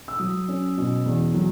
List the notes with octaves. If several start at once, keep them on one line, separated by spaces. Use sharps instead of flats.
E6
F#3 D#6
C#4
B2
E2
F#3